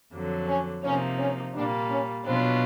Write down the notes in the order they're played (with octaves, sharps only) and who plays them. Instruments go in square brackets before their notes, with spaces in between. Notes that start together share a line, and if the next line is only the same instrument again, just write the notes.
[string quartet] F2 D3 F#3
[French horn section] C#4
[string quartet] C3 F3 A#3 D#4 [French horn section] C#4
[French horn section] C#4
[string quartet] A#2 G3 A#3 [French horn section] D4
[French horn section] C#4
[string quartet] B2 F#3 B3 D4 F4 [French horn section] C4